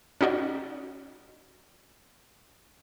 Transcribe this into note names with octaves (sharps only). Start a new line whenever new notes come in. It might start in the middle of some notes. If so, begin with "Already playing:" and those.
C#4 D#4 F#4 D5 D#5